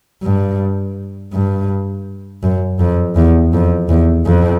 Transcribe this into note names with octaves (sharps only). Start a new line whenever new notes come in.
G2
G2
F#2
F2
E2
F2
E2
F2